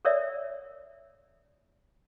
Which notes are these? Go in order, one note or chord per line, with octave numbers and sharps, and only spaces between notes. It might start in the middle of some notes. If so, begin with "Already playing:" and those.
A4 A#4 C#5 D5 E5